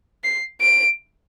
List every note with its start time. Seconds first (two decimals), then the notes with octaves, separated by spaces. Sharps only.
0.24 C7
0.61 D7